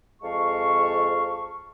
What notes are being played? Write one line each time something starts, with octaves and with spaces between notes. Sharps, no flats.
F2 G#3 F5 A5 C#6